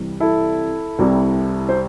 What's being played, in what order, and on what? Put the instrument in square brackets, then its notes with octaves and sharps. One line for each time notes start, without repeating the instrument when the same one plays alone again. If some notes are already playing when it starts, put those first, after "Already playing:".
Already playing: [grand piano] C2 C3 E3 G3
E4 A4
C2 C3 G3
C5